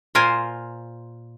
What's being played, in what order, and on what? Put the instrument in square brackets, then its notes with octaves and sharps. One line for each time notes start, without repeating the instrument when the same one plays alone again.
[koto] A#2 F4 A#4 C5 G#5